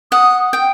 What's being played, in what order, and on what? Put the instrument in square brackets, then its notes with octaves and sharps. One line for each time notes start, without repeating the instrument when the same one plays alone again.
[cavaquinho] F#5 [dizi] D#6
[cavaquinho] G5